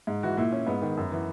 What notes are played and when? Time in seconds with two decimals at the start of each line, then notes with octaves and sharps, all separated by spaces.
0.07 G#2
0.23 E3 F#4
0.37 A#2 E4
0.52 C#4
0.67 G#2 B3
0.82 D#3
0.97 F#2
1.12 E3